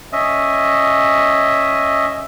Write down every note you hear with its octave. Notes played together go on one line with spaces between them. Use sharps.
C#4 D#5 E5